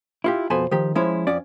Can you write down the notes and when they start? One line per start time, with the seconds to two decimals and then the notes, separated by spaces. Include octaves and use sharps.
0.24 E4 F4 G4
0.50 F2 B2 A4 C5 G#5 B5
0.71 D#3 F3 G4
0.95 F3 G#3 C#4 E4
1.27 F2 C#4 D5